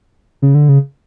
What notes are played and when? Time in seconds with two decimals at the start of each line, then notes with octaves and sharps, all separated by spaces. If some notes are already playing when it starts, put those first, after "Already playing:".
0.42 C#3
0.55 D3
0.69 C#3